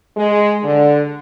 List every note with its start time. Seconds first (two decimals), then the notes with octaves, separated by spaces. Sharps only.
0.17 G#3
0.63 D3